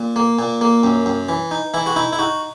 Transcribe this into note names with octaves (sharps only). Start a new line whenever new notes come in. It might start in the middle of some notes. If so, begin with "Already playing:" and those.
Already playing: A#2
A#3
A#2
A#3
F#2
F#2
E3
D#4
E3 E4
F#4
D#4 E4
E4
D#4 F#4